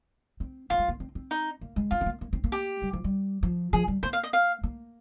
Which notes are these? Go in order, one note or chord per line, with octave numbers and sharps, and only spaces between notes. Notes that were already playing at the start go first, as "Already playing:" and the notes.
C4
A#3 F4
G#3
A#3
C4
C4
D#4
A#3
G#3
C4 F4
C4
A#3
A#3
C4
A#3
G4
G3
F3
G3
F3
F3 G#4
G3
A#3 C5
F5
D#5
F5
A#3